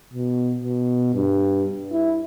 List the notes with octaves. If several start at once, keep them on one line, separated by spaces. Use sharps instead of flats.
B2
B2
G2
E4